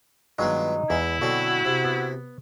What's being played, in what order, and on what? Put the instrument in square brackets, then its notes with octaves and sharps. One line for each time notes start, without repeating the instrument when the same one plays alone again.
[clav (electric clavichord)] G2 F#3 G#3 [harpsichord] D#3 B3 F4 [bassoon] D#4
[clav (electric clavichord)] E2 [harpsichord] G#3 [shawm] E4
[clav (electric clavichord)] B2 [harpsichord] D3 F#3 C4 [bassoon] F#4
[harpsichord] C3
[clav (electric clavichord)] B3